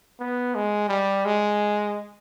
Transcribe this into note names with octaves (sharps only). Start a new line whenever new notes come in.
B3
G#3
G3
G#3